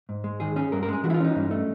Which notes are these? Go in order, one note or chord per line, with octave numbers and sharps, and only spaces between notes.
G#2
G#3
D#3 G#4
C#4 G#4
G2 A#4
A#4
G#3 G#4
E3 F#4
E4
F4
C#4 D#4
G2
A3